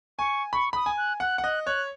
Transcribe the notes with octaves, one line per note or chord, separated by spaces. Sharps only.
G#5 C#6
B5 C#6
B5 D#6
G#5
F#6
F#5 F#6
F#5
D#5 F#6
C#5 F#6